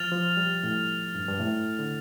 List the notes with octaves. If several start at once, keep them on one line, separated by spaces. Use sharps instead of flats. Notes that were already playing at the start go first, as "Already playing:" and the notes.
Already playing: F3 F6 A6 F7
F3
G3
A2
G2
G2
A2
D3